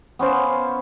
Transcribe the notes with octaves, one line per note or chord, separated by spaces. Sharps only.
B3 C#4 C5 F5